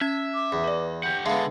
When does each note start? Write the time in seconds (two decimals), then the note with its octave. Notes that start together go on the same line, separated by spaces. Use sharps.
0.01 C#4 E5 G#6
0.34 D6
0.52 E2
0.64 B4 D5
1.03 G4 F#5 G6
1.26 D3 G#3 B3 A4 E5 F5